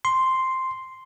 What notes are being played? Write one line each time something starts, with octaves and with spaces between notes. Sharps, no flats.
C6